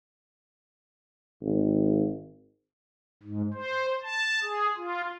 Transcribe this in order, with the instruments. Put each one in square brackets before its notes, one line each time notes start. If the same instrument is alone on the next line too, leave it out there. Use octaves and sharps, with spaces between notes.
[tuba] G#1
[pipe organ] G#2
C5
A5
G#4
F4